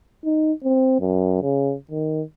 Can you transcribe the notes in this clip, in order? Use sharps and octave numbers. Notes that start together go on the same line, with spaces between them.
D#4
C4
F#2
C#3
D#3